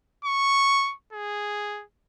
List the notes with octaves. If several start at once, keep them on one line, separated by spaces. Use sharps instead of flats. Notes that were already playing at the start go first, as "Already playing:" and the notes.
C#6
G#4